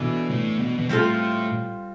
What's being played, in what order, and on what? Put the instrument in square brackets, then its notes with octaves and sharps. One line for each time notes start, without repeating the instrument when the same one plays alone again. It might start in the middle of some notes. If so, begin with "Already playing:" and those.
Already playing: [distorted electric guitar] B2 [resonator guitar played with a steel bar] E3 B3 D4 A4
[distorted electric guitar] A2
B2
B2
[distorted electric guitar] A2 [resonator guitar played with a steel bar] G3 C4 F4 A4